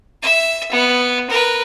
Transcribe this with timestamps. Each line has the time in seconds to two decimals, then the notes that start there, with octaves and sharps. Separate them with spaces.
0.22 E5
0.72 B3
1.30 A#4 B4